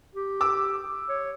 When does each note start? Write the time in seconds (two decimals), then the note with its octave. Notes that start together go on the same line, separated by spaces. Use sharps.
0.15 G4
0.41 D6 E6
1.09 C#5